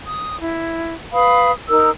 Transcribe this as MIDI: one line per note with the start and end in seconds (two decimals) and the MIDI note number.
0.05 0.40 87
0.41 0.93 64
1.13 1.52 71
1.13 1.52 77
1.13 1.52 83
1.13 1.52 87
1.69 1.90 63
1.69 1.90 70
1.69 1.90 88